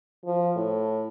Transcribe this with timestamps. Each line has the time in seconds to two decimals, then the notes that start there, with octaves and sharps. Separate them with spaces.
0.25 F3
0.56 A2